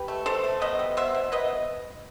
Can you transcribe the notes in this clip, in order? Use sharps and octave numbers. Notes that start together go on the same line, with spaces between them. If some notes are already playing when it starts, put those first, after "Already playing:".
Already playing: G4 B4
A3
E3 A4 C5
A3
B2 B4 D#5
G3
B3 C5 E5
B2
B2 B4 D#5